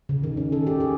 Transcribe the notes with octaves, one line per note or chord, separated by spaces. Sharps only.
C#3
D#3
C#4
A4
G4
G#4